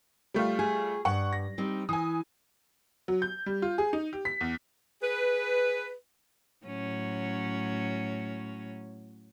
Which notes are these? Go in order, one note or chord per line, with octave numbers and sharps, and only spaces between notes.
G3 A3 F4
G#4
G2 F#5 C#6
A#6
G3 C4 D#4
E3 G#5 D#6
F#3
G6
G3
F4
G#4
D#4
G4
B6
E2
G#4 B4
A2 F#3 C#4